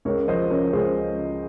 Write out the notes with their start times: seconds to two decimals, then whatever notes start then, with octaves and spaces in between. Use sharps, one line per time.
0.05 C#2 A#4 C#5
0.28 F3 C5 D#5
0.50 C#3 A#4 C#5
0.73 C#2 G#4 C5